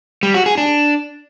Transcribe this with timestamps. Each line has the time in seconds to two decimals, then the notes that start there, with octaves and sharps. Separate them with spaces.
0.23 G3
0.34 F#4
0.46 G#4
0.58 D4